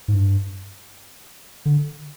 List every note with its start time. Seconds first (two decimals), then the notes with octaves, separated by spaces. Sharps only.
0.08 G#2
0.14 G2
1.65 D3